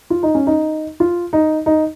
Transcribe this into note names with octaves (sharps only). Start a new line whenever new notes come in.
F4
D#4
C#4
D#4
F4
D#4
D#4